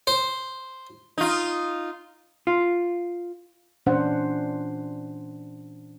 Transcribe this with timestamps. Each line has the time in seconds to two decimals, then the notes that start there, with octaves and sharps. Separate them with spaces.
0.07 C5
1.18 D#4 F4
2.47 F4
3.86 A#2 E3 C#4 D4 C5 F#5